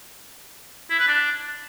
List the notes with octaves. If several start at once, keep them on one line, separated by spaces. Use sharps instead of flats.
E4
B4
D4